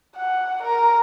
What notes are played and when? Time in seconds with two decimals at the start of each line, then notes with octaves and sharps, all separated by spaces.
0.16 F#5
0.62 A#4